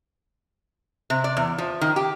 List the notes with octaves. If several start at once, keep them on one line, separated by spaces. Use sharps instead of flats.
C3
D5
E2
F3
D#3
G4